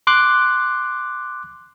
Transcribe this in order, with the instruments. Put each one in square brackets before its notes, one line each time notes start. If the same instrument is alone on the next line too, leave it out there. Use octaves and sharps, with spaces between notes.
[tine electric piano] C6 D6 F#6